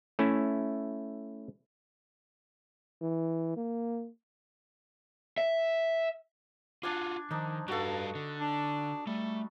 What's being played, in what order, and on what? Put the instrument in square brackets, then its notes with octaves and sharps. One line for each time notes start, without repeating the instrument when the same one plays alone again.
[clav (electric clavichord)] A3 C#4 E4
[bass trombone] E3
A#3
[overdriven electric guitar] E5
[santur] D4 G#5 D6 [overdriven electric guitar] F4 F#4
[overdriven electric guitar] D#3 [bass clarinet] F3 [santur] D4 D#4
[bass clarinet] G2 [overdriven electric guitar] G3 F5 [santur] F#4 A4
[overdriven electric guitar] D3
[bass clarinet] D4
[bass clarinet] G3 [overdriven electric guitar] A3